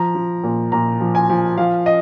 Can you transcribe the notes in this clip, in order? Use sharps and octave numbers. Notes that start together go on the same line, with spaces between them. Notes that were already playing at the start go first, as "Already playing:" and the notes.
Already playing: F3 A#5
F3
A#2
A#2 A#5
F3
G#5
F3
F3 F5
D#5